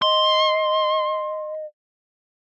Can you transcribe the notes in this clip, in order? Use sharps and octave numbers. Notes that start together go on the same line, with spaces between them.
D#5 C6